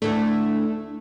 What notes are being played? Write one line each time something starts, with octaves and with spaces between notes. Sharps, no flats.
D2 E3 A3 D4